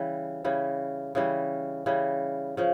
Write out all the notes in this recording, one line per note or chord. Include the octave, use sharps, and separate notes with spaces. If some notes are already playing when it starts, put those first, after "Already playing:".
Already playing: C#3 E3 G3
C#3 E3 G3
C#3 E3 G3
C#3 E3 G3
C#3 F3